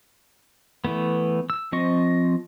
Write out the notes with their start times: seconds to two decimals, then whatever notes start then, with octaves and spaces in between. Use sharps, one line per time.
0.85 E3 A3 B3
1.50 E6
1.72 F3 C4 D#5 C#6